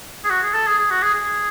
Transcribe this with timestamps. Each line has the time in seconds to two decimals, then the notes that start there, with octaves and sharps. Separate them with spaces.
0.25 G#4
0.30 F#4
0.42 G#4
0.54 A4
0.67 G#4
0.78 G#4
0.91 F#4
1.02 G#4
1.14 G#4